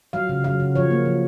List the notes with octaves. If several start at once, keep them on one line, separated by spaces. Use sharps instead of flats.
F#3 F5
C#3
F#3 F5
C#3
F3 C#5
A#3
F3